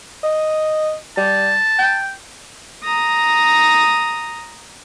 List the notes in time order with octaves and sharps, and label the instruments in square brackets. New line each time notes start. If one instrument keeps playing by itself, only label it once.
[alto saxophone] D#5
[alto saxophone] G3 [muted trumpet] A5
[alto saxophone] G5
[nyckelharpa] A#5 D#6